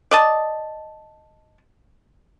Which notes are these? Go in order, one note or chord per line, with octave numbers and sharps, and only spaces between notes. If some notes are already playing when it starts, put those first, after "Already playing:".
D5 D#5 A5